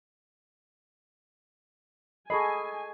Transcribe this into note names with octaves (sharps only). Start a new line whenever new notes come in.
G#4 A4 D#5 G#5 B5 C#6 C7